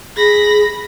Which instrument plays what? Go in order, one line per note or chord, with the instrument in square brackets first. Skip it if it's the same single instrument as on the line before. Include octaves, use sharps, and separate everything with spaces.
[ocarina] G#4 [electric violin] B5 A#6